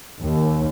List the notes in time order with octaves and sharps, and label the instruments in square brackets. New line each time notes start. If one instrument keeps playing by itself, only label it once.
[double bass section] D#2